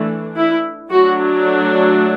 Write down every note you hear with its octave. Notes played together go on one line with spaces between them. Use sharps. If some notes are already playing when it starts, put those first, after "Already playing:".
Already playing: E3 A3 D4
E4
F#3 A3 D4 F#4